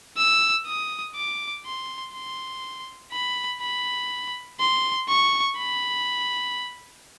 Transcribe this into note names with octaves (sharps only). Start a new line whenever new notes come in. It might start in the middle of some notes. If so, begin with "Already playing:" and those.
E6
D#6
D6
C6
C6
B5
B5
C6
C#6
B5